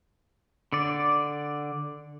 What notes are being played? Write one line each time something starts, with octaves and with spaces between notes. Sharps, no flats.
D3 D5